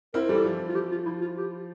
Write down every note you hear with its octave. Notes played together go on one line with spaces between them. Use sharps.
C4 E4 A#4
E3 G3 A4
F3
F4
G4
F4
F3 E4
F4
G4